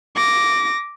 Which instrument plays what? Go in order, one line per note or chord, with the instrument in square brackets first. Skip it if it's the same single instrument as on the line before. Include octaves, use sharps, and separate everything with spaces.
[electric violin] D6 A#6